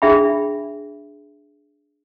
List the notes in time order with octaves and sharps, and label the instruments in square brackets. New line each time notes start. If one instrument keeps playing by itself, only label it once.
[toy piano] D4 G#4 E5 G5 B5